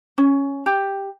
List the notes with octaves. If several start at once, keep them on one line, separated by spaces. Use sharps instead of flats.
C#4
G4